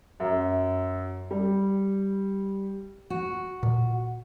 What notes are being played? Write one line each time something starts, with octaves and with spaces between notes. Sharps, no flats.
F#2
G3
F#4
A#2